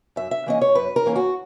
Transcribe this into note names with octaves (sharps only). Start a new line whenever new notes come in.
F#2 E5
E5
E3 A#3 C#4 D#5
C#5
F#2 B4
A#4
E3 A#3 C#4
F#4